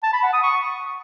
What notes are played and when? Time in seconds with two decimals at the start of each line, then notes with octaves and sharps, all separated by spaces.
0.03 A5
0.13 B5
0.23 F#5
0.33 D#6
0.43 C#6